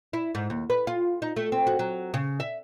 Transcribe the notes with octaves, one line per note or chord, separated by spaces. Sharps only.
E4
G#2
D#2
B4
F4
D#4
A3
C4
F#4
F#3
C#3
E5